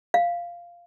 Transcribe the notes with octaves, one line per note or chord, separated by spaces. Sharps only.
F5